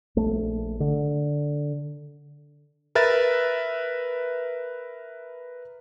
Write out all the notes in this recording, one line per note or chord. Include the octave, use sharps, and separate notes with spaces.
A#1 A3
D3
A#4 B4 E5 A6